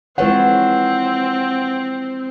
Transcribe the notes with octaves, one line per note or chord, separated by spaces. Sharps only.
E3 F3 G#3 C4 A4 B4 C#5 F#5